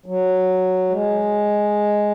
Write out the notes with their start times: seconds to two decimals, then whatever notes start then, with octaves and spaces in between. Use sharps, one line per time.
0.06 F#3
0.90 G#3